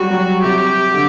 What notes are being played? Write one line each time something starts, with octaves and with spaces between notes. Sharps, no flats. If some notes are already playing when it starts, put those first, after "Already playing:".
Already playing: F#3 G3 F#4
F#3
C3 G4
D3